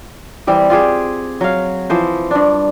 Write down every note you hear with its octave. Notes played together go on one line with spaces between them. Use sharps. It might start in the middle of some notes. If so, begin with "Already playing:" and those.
E3 G3 C4
F4 G4 G#4 C5
F#3 F5
E3 F3 C5
G2 D4